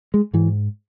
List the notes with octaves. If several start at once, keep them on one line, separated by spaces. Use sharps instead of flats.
G#3
G#2 E3